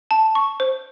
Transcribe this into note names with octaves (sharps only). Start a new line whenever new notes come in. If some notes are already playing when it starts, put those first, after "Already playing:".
A5
C#6
C5